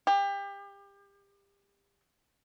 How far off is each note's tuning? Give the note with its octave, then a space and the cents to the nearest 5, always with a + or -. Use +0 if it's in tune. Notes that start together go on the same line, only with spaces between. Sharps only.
G4 +30